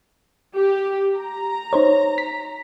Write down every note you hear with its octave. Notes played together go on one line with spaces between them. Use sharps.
G4
A#5
D#4 C5 C#5
B6